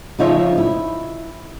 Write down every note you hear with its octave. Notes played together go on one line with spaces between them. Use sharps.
C#3 F3 D#4 F4 C#5 E5
E4